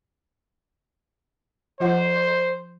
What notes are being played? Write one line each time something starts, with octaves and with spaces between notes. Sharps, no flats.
F3 F4 C5 F#5